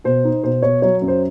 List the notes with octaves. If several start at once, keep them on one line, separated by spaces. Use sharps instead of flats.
B2 C5
D#4
B2 C5
B2 C#5
F#3 C#5
F#2
C5